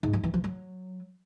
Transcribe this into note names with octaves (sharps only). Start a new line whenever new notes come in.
G#2
F3
E3
F3
F#3